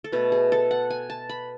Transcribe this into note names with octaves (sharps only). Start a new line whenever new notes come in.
A4
B2 A3 B4
G#4
A4
F#5
G#5
A5
B5